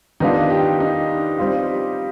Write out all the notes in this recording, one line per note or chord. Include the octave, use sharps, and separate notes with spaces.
D#3 G3 B3 D4 D#4 F4
G4
D#4
G3 C4 F4